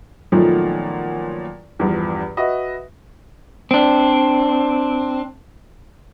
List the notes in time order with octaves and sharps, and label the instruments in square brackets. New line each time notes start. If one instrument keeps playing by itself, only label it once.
[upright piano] A#2 D#3 F3 F#3 A3 B3
E2 G2 F3
F#4 B4 D#5 E5
[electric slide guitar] C4 D4